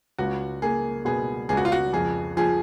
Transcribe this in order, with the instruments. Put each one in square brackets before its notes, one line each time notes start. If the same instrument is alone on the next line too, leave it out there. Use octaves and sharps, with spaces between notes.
[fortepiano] C#2 [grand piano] F#4
[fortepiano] A#3 [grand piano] G#4
[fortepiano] B2 [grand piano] G#4
[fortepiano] C#2 [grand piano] G#4
[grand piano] F#4
F4
F#4
[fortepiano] F2 [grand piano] G#4
[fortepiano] F3 [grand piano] G#4